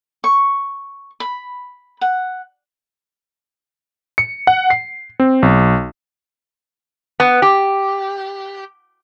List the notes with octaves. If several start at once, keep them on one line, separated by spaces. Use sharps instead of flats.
C#6
B5
F#5
C#7
F#5
C7
C4
B1
B3
G4